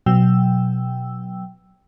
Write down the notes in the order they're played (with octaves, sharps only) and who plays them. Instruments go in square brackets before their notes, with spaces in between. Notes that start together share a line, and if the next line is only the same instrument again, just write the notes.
[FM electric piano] B2 F#3 G5 E6